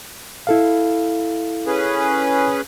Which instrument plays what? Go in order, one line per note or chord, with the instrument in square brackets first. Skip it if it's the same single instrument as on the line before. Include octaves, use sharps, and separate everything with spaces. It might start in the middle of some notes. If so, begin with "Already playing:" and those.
[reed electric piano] E4 A4 F5
[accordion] C#4 G#4 B4